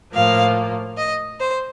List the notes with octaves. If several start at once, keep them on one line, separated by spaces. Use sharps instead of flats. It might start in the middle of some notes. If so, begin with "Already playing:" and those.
A2 F3 A#3 F5
D#5
C5